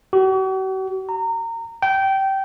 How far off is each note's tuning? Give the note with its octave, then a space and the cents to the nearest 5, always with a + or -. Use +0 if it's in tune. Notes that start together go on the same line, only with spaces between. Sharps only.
F#4 +45
A#5 -25
G5 -20